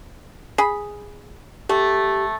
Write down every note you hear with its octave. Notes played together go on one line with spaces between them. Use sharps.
G#4 B5
A3 G4